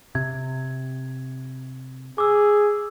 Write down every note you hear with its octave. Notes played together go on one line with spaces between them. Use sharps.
C3 G#6
G#4 D6 E6